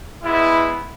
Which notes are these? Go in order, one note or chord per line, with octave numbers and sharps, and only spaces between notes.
G#3 B3 E4